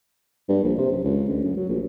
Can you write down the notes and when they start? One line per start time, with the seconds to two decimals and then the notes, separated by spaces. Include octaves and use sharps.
0.49 G2
0.63 A#1
0.78 C3
0.92 F#2
1.04 C#2
1.29 D2
1.44 F#2
1.57 F#3
1.69 A#1